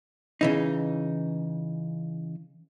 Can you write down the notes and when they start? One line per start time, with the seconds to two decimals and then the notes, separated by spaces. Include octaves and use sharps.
0.41 C#3 E3 D#4